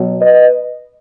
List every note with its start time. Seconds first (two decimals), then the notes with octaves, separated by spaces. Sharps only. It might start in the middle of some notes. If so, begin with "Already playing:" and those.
Already playing: B2 F#3
0.21 B4 D#5